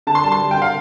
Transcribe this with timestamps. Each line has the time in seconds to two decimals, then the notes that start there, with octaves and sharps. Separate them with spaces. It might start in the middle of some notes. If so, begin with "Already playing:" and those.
0.07 D3 A5
0.15 C6
0.23 G3 A5
0.32 C6
0.40 G3
0.51 G5
0.56 D3
0.62 F5